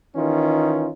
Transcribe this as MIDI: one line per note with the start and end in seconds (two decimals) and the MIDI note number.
0.15 0.90 51
0.15 0.90 52
0.15 0.90 61
0.15 0.90 63
0.15 0.90 65